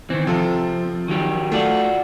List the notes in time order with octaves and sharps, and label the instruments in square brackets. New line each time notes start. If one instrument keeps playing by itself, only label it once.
[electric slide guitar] D#3 E3 [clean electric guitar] C4
[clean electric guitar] C3 [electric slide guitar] F3 [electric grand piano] C4 F4 A4
[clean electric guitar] D#3 F#3 G4
[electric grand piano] A3 [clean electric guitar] F4 F#4 D5